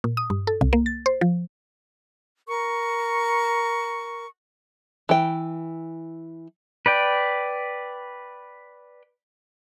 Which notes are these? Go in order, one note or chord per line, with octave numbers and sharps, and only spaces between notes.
A#2
D#6
G2
A4
C2
A#3
A6
C5
F3
A#4 C#6
E3 G5
B4 D5 G5